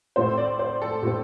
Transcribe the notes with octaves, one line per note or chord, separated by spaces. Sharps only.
A2 A3 C4 C5
D5
C5
A4
A2 A3 C4